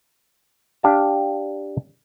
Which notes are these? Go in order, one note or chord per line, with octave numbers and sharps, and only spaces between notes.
D4 G4 F5 A5